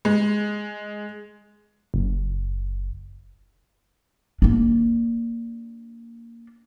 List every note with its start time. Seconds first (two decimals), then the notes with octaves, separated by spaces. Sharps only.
0.05 G#3
1.94 F#1
4.42 A#3 D4